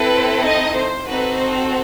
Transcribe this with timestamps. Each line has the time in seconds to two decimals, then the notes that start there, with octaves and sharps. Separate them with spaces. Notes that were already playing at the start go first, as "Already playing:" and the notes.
Already playing: C4 E4 A4 B4
0.43 D#4 D#5
0.75 C5
1.07 C4 D#4 F#4 A4 B4
1.39 C5